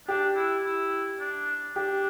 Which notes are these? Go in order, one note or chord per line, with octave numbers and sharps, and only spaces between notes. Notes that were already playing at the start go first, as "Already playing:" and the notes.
D4 G4
E4
E4
D4
D4 G4